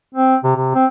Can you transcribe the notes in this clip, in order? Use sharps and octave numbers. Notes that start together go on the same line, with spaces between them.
C4
C3
C3
C4